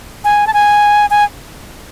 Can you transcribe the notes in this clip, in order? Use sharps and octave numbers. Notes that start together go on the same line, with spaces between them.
G#5
A5
G#5
G#5